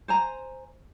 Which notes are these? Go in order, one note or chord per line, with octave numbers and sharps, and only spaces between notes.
C5 G#5 A#5